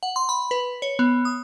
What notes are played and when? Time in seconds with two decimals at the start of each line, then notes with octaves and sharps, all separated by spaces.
0.03 F#5
0.16 C6
0.29 B5
0.51 B4
0.82 C#5
0.99 B3
1.25 D#6